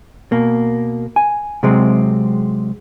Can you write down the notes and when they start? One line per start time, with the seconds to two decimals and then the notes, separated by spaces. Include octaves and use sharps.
0.32 B2 A#3
1.16 G#5
1.63 C3 F#3 G#3 C4